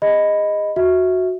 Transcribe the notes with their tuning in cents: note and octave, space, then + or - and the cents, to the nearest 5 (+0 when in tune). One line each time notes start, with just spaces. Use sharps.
G#4 -35 D#5 +0 B5 +0
F#4 -10 E5 -15